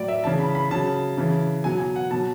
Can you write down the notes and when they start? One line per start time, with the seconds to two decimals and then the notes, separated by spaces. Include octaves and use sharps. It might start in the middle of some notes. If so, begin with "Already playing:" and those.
Already playing: A2 F#3 D5
0.08 E5
0.24 C#3 E3 A5
0.40 B5
0.55 B5
0.71 C#3 F#3 A5
1.18 C#3 E3
1.64 B2 F#3 G#5
1.80 G#5
1.96 F#5
2.11 B2 F#3 A5